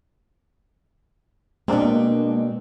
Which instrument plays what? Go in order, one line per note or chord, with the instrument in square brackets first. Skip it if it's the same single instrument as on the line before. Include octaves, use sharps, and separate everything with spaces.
[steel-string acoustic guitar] B2 C4 [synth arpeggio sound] G#3 A#3 D4